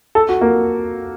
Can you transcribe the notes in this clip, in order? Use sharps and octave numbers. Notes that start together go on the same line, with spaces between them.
A4
F#4
A#3